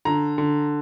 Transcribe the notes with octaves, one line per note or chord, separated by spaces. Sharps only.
D3 A#5
D3